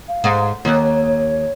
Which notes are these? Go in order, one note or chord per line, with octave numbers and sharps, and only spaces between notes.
F5
G#2
D#2 C#5